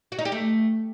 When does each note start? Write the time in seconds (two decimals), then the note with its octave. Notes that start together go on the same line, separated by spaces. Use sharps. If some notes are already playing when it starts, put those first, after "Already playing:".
0.12 F#4
0.19 D#4
0.25 G4
0.32 A3